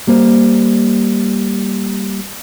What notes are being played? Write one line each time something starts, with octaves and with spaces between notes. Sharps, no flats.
G3 A#3 C5